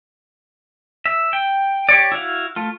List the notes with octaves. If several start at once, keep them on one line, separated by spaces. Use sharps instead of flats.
E5
G5
G4 C#5 D5
E4 F#4 F5
A3 F4